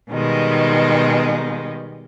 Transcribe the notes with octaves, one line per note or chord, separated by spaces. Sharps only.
B2 D#3 G3 G#3